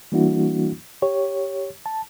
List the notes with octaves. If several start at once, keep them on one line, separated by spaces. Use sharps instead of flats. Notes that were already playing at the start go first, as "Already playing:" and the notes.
E3 G3 A#3 D4 E4 F#4
G4 C#5
A5